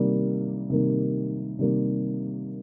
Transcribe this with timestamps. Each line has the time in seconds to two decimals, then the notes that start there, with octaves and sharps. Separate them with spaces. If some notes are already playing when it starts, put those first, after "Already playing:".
Already playing: C3 D#3 G3 A#3
0.70 C3 D#3 G3 A#3
1.59 C3 D#3 G3 A#3